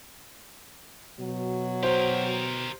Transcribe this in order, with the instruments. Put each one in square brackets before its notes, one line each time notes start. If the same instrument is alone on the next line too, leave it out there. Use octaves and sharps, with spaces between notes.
[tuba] B2 [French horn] F#3
[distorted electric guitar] G4 A#4 [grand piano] C5